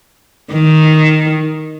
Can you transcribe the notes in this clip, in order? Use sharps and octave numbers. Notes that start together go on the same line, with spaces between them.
D#3